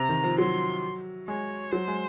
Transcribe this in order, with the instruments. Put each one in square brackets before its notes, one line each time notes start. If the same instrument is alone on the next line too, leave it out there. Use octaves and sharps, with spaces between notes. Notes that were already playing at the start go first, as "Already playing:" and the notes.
Already playing: [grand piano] C3 [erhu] A#5
[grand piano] D#3
F3
[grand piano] F#3 [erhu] C6
[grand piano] G#3 [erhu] C#5
[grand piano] F#3 [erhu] C5
[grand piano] G#3